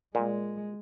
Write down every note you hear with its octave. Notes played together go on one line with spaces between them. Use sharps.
A#2 G#3